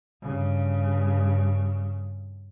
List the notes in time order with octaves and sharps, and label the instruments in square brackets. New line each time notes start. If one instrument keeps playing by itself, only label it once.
[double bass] G2 C#3